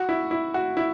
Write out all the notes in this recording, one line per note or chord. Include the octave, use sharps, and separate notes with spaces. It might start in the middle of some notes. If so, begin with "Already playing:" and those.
Already playing: F#4
E4
E4
F#4
E4